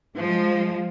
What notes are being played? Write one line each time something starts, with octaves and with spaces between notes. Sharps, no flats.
F3 G#3